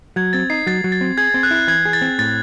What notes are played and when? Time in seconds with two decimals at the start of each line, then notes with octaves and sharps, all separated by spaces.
0.16 F#3 G#6
0.33 C4 A6
0.50 D#4 C7
0.67 F#3 A6
0.84 F#3
0.92 A6
1.01 C4
1.18 G#4 G#6
1.34 C4
1.43 F#6
1.51 E4
1.67 E3 G#6
1.85 G#4
1.93 A6
2.01 C4
2.19 A2 A6